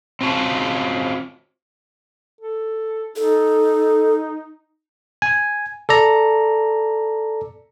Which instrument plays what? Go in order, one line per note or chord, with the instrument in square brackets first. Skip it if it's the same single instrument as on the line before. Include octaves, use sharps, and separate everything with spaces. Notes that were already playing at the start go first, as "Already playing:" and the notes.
[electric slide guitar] C4 C#4 F4 F#4 A5
[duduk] A4
[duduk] D#4 [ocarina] A4
[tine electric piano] G#5
A4 D5 A#5